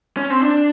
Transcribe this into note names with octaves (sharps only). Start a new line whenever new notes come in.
C#4
C4
D4